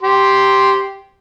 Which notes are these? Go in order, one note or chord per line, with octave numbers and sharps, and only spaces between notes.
G4 C6